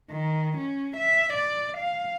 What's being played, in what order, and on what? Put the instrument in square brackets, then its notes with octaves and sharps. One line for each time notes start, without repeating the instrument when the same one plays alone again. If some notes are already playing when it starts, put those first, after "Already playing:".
[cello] D#3
C#4
E5
D5
F5